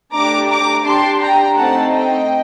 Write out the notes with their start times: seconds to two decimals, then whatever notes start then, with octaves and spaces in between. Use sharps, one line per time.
0.13 A3 D4 G4 A#5 D6
0.49 A#5 D6
0.84 D4 G4 A5 C6
1.20 G5 A#5
1.56 A3 C4 D#4 F#5 A5
1.92 D#5 G5